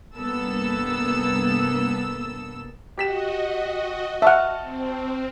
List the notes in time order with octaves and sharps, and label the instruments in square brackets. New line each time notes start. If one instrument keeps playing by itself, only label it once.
[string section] C2 G2 A#3 B3 A4 E6
[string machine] F#4 D#5 [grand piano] G4 B6 E7
[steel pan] E5 F#5 [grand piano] A5 C#6 F6
[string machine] C4